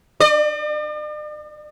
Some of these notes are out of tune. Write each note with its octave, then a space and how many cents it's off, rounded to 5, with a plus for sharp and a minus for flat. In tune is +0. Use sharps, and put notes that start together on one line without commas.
D5 +45